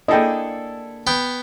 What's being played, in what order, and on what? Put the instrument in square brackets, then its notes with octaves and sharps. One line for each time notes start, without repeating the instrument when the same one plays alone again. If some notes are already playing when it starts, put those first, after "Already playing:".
[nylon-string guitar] A#3 D4 [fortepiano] E4 G#4 A4 [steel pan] D#5 G5
[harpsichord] B3 G5